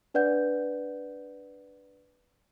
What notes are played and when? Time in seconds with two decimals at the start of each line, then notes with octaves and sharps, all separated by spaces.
0.14 D4 B4 D5 F#5 G6